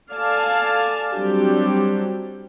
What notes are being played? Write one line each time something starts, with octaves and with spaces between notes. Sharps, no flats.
A4 D5 F5 G#5 A5
F#3 G3 C4 D4 G4